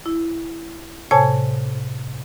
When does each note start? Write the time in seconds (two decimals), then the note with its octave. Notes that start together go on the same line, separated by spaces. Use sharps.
0.06 E4
1.11 A2 C3 C#5 G#5 A5 G#6